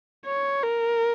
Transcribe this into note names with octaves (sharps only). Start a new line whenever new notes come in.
C#5
A#4